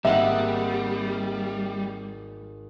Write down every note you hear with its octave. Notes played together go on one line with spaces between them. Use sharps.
G#1 G3 A#3 C4 D#5 E5 F#5 F#6